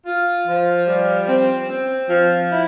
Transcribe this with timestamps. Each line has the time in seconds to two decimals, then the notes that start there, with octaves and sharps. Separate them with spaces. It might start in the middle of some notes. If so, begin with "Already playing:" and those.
0.06 F4
0.47 F3
0.88 G3
1.28 C4
1.69 C4
2.10 F3
2.50 E4